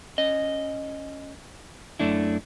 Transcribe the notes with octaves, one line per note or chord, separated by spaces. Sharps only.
C#4 D#5
F#2 A3 D4 E4